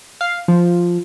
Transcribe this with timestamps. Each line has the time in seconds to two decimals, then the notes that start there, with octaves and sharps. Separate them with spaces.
0.21 F5
0.48 F3